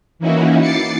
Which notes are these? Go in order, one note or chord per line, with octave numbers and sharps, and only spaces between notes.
E3 A#3 C#4 D#4 E4 F#4
D6 A6 C7 C#7